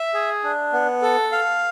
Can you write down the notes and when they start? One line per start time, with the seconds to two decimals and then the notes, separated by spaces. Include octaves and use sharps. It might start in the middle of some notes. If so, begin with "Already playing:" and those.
Already playing: E5
0.14 G#4
0.44 D4
0.73 B3
1.02 A4
1.32 F5